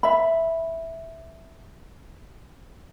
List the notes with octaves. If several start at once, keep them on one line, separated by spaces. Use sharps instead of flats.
E5 B5